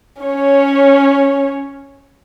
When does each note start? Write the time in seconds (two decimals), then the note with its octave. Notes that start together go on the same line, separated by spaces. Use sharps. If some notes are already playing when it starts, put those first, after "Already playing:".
0.22 C#4 C#5